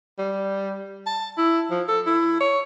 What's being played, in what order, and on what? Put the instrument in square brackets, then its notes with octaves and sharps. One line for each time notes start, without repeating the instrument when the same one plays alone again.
[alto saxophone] G3
A5
E4
F3
A4
E4
C#5